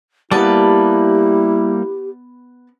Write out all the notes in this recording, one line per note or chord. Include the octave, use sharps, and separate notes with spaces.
G3 A#3 B3 E4 G4 B4 A5